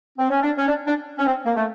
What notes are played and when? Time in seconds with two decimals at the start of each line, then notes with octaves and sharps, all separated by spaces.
0.19 C4
0.30 C#4
0.42 D4
0.58 C#4
0.68 D4
0.87 D4
1.18 C#4
1.26 C4
1.46 A#3
1.56 A3